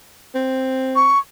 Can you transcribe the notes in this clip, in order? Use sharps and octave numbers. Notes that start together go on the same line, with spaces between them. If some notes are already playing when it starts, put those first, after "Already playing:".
C4
C#6